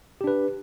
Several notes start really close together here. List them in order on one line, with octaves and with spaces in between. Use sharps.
G4 D4 B4